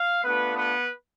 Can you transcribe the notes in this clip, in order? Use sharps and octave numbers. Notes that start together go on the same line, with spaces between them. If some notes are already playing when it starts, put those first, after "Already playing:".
Already playing: F5
A3 B3 D4 F4 B4
B3 B4